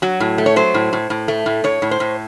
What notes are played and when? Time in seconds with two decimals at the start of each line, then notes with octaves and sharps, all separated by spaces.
0.02 F#3 F#4
0.20 A2
0.38 A3
0.46 C#5
0.56 F#3 C5
0.74 A2
0.93 A2
1.10 A2
1.28 A3
1.46 A2
1.64 A2 C#5
1.82 A2
1.91 C5
2.00 A2